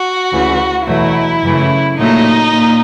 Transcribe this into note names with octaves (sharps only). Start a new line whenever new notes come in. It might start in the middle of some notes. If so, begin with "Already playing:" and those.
Already playing: F#4
D2 C#3 E3
E2 B2 F#3 A3 E4
F#2 C#3 E3 A3
A#2 F#3 A3 D#4
A#2